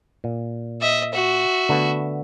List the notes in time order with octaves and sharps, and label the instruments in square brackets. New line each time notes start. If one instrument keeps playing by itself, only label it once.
[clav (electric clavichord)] A#2
[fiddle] D#5 E5
F#4 E5
[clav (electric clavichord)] D3 A3 B3